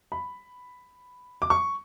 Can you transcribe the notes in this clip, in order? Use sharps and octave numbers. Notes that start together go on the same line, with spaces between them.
B5
D6
C#6